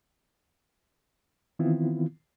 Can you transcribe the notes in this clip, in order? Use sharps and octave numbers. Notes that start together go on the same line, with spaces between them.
D#3 E3 B3 C4 E4 F4